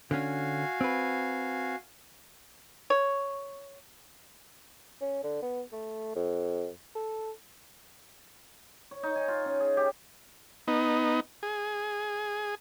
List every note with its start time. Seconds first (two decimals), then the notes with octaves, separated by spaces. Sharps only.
0.11 D3 C#4 F#4 F5 G#5
0.81 C4 B4
2.90 C#5
5.01 C#4
5.23 D3
5.43 B3
5.72 A3
6.16 F2
6.95 A4
8.91 C#5
9.03 D#4
9.16 G#5
9.28 F4
9.46 C#4
9.60 G#4
9.77 G4
10.68 B3 D#4
11.43 G#4